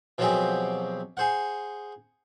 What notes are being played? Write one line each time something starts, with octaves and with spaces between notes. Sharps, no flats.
B2 F3 F#3 C4 G4 G#4
G#4 C5 F#5